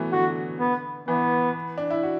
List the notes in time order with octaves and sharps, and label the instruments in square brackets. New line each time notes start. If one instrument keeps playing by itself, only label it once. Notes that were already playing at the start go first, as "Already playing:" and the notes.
Already playing: [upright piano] E3 F#3 A3 B3
[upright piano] D3 [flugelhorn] F#4
[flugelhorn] B3
[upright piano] E3 [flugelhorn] B3
[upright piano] D4
E4
F#4